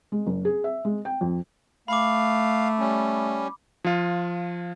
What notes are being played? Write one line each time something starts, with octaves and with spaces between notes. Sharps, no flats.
G#3
F#1
G#4
E5
G#3
G5
F2
A3 F5 B5 D6
G3 C#4
F3 F4